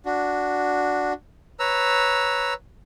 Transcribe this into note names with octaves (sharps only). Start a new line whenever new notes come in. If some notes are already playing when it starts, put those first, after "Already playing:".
D4 F#4
B4 C#5 A#5 E6